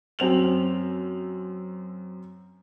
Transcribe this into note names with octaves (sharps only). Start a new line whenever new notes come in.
F#2 C4 F7 F#7